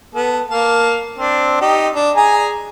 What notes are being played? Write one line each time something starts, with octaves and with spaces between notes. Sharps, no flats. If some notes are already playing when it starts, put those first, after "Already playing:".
B3 A4
A#3 F5 A5
C4 D4
D#4 G4
D4
G#4 G#5 A#5